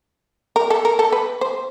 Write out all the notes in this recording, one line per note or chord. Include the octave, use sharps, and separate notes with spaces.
A#4
A4
A#4
A4
B4
C5